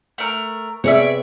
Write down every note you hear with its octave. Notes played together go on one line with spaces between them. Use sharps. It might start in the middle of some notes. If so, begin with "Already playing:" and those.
A3 A#4
C3 B3 G#4 C#5 D5 E5